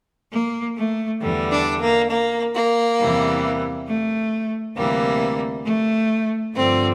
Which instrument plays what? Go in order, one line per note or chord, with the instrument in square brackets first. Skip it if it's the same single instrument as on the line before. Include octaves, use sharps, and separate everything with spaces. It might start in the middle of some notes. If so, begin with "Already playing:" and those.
[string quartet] A#3
A3
E2 D3 G3
D4
A#3
A#3
A#3
E2 C3 E3 G3
A3
D2 C3 E3 G3 A#3
A3
G2 D3 F3 C4